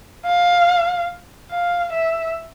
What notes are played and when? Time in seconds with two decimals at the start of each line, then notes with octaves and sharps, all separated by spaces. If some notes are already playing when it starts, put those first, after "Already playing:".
0.27 F5
1.51 F5
1.93 E5